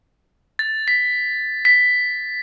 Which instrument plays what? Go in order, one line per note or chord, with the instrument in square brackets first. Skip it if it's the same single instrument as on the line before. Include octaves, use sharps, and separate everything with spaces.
[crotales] A6
B6
B6